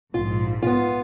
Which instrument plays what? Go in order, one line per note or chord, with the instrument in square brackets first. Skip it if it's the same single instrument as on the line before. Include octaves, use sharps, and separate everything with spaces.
[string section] A#1 G#2 [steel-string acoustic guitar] F4
[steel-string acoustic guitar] B3 F4